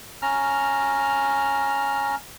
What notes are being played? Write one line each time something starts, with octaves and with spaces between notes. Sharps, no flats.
C#4 A#5 F6